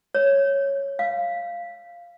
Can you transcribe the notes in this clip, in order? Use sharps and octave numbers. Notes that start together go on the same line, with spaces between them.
C#5
F5